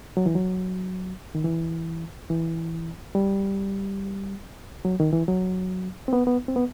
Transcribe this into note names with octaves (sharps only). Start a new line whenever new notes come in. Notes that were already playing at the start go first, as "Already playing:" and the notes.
F#3
E3
F#3
D#3
E3
E3
G3
F#3
D#3
E3
F#3
C4
B3
B3
C4
B3